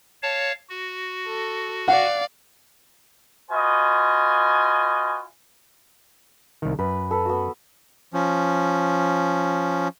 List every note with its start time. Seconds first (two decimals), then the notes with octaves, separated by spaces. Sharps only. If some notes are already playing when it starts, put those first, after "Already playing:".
0.22 C#5 F5 A5
0.69 F#4
1.27 A4
1.88 D5 F5 F#5
3.51 F4 F#4 B4 D#5 G#5
6.62 C2 D#3
6.79 F#2 B4
7.11 A4 B4
7.25 B3 F#4
8.14 F3 C#4